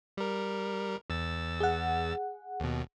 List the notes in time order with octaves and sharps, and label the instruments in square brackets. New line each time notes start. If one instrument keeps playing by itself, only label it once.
[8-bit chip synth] G3 A#4
E2 E6 A6
[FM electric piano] G#4 F#5
[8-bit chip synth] D#2 B2